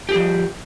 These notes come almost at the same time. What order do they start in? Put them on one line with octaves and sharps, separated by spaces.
G4 G#4 F3